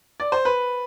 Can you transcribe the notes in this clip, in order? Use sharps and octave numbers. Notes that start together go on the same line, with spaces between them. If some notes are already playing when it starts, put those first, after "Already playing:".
D5
C5
B4